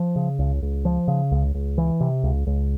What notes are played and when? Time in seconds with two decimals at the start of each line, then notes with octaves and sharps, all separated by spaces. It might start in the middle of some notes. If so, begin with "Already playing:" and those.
Already playing: F3
0.16 C#3
0.39 C#2
0.62 C#2
0.85 F3
1.08 C#3
1.32 C#2
1.55 C#2
1.78 E3
2.01 C3
2.24 C#2
2.47 C#2